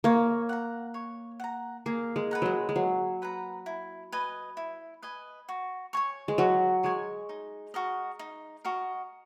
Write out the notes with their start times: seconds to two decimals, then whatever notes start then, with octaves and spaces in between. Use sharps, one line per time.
0.04 A#3 C#5
0.49 F#5 A#5
0.94 C#5
1.40 F#5 A#5
1.86 A#3 G#4
2.16 G#3
2.31 B4 F#5 A#5
2.42 F#3 G#3
2.69 G#3
2.76 F#3 G#4
3.22 B4 F#5 A#5
3.66 E4
4.12 B4 D#5 G#5
4.57 E4
5.02 B4 D#5 G#5
5.49 F#4
5.93 C#5 G#5 C#6
6.28 G#3
6.38 F#3 F#4
6.83 G#3 C#5 G#5 C#6
7.29 D#4
7.74 F#4 A#4 D#5
8.19 D#4
8.65 F#4 A#4 D#5